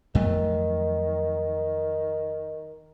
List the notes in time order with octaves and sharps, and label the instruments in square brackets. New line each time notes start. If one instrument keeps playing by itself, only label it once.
[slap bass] F2 F#3 A3 [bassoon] D#3